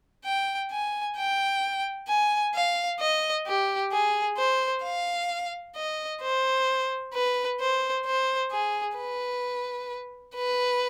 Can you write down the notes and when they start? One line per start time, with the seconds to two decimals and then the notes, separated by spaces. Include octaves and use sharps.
0.25 G5
0.71 G#5
1.17 G5
2.08 G#5
2.54 F5
3.00 D#5
3.47 G4
3.92 G#4
4.38 C5
4.84 F5
5.76 D#5
6.22 C5
7.14 B4
7.60 C5
8.06 C5
8.51 G#4
8.97 B4
10.35 B4